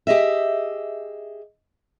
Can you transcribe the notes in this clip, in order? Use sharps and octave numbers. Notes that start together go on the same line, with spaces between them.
G4 G#4 D#5 E5